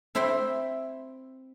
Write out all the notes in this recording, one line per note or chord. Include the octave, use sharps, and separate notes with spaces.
C4 E4 C5 E5 G5 C6